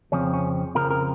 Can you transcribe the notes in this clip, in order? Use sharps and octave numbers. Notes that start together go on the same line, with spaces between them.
F2 C#3 F3 C4 C#4
C#4
F2 C#3 F3 C4 A#4
A#4